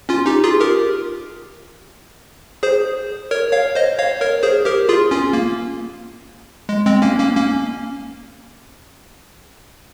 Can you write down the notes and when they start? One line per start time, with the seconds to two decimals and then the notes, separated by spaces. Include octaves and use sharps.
0.09 C#4 F4
0.26 D#4 G4
0.44 F4 G#4
0.60 G4 A#4
2.63 G#4 C5
3.31 A#4 C#5
3.53 C#5 F5
3.75 C5 D#5
3.99 C#5 F5
4.21 A#4 C#5
4.43 G#4 C5
4.65 G4 A#4
4.89 F4 G#4
5.11 C#4 F4
5.33 A#3
6.69 G#3
6.86 G#3 C4
7.02 A#3 C#4
7.19 A#3 C#4
7.36 A#3 C#4